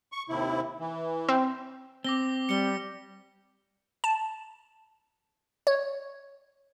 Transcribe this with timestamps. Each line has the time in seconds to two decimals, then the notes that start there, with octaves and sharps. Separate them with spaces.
0.12 C#6
0.29 D#2 C3 E4
0.80 E3
1.29 C4
2.04 C4 D6 A#6 G7
2.49 G3 C#7 G7
4.04 A5
5.67 C#5